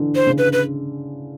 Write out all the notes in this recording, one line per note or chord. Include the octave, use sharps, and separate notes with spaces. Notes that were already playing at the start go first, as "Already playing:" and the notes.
Already playing: D3 E3
C5
C#3
B4
B4